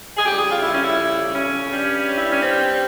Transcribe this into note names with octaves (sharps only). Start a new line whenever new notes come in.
G#4
F2 C#3 G3 G4
G#4
F4
E4
C#4
E4
C#4
G2 G3
E4
C#4
C4